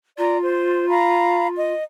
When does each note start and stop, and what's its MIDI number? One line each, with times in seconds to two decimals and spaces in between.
0.18 1.73 65
0.18 0.37 74
0.18 0.37 82
0.42 0.87 72
0.88 1.48 77
0.88 1.48 82
0.88 1.48 83
1.56 1.84 75